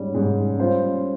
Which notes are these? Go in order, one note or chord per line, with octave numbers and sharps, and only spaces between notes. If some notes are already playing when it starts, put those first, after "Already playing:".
Already playing: G#2 G3 C#4
G#2 G3 C#4
G3 C#4 F4 C5